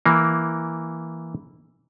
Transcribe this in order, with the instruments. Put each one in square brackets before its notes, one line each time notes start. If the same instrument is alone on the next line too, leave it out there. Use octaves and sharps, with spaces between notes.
[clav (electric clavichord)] E3 A#3